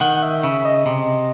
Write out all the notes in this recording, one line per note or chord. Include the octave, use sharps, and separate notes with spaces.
D#3 F#5
F#5
E5
C#3 E5
D#5
C3